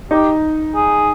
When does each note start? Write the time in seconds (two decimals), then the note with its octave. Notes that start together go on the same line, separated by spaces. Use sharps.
0.11 D#4 G4
0.75 G#4